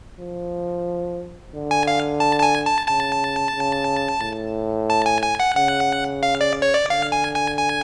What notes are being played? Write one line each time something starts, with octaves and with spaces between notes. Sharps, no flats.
F3
D3
G#5
F5
A5
A5
G#5
A5
C#3 A5
C#3
A2
A5
G#5
G#5
F#5
C#3 F#5
F5
D5
C#5
D5
D3 F5
G#5
G#5
G#5